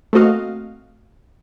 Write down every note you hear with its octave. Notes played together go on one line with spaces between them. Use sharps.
A3 A#3 C4 F#4 D#5 F5